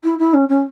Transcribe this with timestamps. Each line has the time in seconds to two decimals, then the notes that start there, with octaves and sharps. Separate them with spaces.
0.03 E4
0.18 E4
0.33 C#4
0.48 C#4